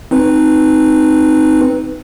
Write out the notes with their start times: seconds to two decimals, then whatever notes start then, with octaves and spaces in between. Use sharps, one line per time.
0.11 C4 D#4 B4